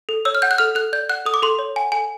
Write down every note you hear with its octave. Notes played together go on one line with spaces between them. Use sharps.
A4
C#5 E6
F6
F#5 G6
F#6
A4 F6
A4 F#6
D5 G6
F#5 F#6
A4 D#6
D6
A4 C6
C#5
F#5 G#5
A4 G#5